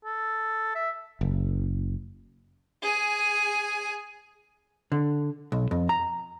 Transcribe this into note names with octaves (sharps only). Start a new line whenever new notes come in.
A4
E5
F#1
G#4 G#5
D3
B1
F2
A#5